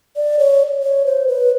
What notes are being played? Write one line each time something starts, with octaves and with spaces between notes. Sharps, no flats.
D5
C#5
C#5
C5
B4